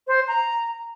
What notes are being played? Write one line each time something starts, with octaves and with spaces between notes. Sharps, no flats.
C5
A#5